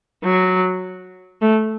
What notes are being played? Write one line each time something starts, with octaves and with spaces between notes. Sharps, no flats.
F#3
A3